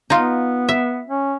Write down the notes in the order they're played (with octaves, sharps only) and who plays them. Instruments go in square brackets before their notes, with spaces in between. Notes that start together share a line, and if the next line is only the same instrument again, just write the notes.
[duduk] B3 [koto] D#4 F4
[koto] E5
[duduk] C#4